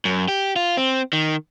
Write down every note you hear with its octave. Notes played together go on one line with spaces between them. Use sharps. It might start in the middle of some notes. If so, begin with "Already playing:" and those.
F#2
G4
F4
C4
D#3